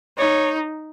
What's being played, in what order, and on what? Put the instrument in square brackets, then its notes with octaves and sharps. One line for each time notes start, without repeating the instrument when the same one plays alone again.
[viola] D#4 [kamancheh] C#5